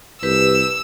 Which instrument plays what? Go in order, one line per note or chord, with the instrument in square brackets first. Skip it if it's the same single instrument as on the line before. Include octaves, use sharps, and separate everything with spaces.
[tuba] C2 [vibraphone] G4 B4 [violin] E6